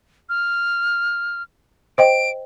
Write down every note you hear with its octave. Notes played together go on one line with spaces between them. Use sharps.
F6
C5 D#5 G5 D7